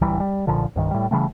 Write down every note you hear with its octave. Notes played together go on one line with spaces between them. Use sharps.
D1 C#2 E3 G3
G3
B1 A#2 D3 F3
C2 G2 D#3
A2 G3
C#3 E3 G3 A3